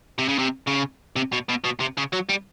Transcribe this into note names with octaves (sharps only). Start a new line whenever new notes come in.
C3
C#3
C3
C#3
C3
B2
B2
B2
C3
C#3
F#3
G3